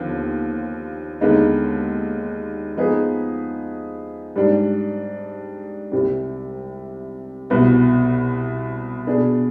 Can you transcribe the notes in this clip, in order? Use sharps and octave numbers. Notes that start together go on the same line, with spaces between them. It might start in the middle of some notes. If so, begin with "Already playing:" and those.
Already playing: D#2 D3 F3 B3
D#2 D3 G#3 B3 D#4
F3 B3 D#4 G#4 B4
G#2 G3 D4
C2 C3 G3
C2 B2 B3
B2 B3 D4 G#4